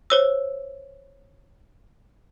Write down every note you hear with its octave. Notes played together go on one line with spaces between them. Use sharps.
C5 C#5 E6